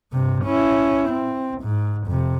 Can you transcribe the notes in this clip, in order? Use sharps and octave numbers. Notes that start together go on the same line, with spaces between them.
G2 C3
C#4 E4
C4
G#2
F2 C3